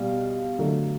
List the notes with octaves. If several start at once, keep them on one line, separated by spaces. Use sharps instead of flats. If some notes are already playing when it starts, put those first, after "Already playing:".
Already playing: B2 G3 F5
D3 F#3 A3